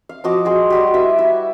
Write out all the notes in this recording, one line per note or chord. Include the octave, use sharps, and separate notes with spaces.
F5
F3 F#4 D#5 D6
F#4 G#4 C6
G3 F#4 G4
E4 B4 E5
E4